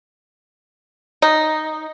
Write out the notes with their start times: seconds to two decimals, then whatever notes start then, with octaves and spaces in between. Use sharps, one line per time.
1.22 D#4